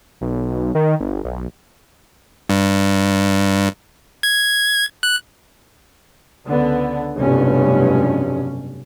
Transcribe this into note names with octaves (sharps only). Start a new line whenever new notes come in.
B1
D#3
G1
B1
G2
G#6
F#6
C#2 D3 B3
F1 B1 G2 C#4